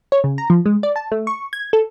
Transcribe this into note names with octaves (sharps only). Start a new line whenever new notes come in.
C#5
C#3
A#5
F3
G#3
D5
A5
A3
C#6
G#6
A4